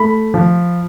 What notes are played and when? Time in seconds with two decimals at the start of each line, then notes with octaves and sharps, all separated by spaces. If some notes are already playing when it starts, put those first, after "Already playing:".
Already playing: A3 B5
0.34 F3